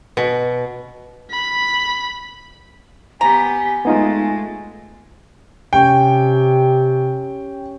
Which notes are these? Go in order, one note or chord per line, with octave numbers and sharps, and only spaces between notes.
B2
B5
B3 G4 G#5 A#5
G#3 A3 B3 D#4 F4
C3 C#4 G4 G5